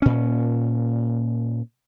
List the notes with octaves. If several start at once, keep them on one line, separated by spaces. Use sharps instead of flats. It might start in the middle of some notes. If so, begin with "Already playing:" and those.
A#2 C#4